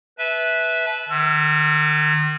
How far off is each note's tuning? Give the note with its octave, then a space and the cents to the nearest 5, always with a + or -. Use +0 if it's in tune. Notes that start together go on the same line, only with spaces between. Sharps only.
B4 -5 E5 -10 A5 -30
D#3 -40 E6 +30